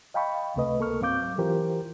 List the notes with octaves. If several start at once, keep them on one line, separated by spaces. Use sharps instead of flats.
D#5 F5 G5 A5 B5 C#6
C#2 C3 A3 B4 D#5
A#3 A4 A#4 C#6 F6
G#2 F#3 C4 F5 D6 G6
E3 F4 G4 A#4 C5